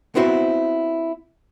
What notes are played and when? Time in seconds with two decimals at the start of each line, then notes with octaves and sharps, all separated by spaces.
0.15 B3 C4 E4 F#4 C5